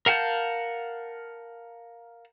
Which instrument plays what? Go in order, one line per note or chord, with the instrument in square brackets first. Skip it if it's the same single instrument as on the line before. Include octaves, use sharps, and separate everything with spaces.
[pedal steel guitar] A#4 F5 F#5 A5 G6